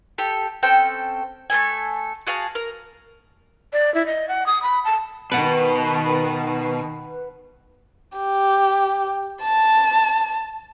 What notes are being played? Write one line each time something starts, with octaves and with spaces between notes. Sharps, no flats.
G4 A4
C4 C#4 A4 G5
A3 B3 A4 G#5
F#4 G#4 F5 A5
A#4
D5
E4
D#5
F#5
D#6
B5
A5
B2 D#3 B4 F#5
G4
A5